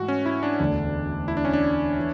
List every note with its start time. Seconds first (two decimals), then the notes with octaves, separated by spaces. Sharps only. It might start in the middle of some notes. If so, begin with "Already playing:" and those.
Already playing: G#2 E3 A3 F#4
0.08 C#4
0.26 E4
0.43 D4
0.59 E1 D2 D3
1.28 E4
1.37 D4
1.45 C#4
1.53 D4
1.98 E3